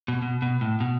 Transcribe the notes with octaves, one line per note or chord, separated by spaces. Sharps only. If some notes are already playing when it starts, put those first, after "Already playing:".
B2
B2
B2
A2
B2